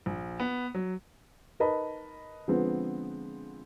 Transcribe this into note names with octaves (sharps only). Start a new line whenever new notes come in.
A#1
B3
F#3
D#4 A#4 B4 D#5 A5 B5
D3 F3 G#3 B3 C4